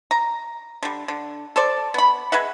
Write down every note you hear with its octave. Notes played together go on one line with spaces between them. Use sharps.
A#5
D3 G3
D3
A4 C5 D5
B3 B5
G#3 B4 E5 F#5